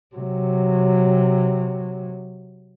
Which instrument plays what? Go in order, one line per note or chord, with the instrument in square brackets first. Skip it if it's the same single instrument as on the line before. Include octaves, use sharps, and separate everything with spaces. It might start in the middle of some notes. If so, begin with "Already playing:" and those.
[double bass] C3 F#3